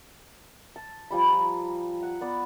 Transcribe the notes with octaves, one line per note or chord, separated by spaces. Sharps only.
A5
F3 G3 B5
A#5
F#5
B3 D5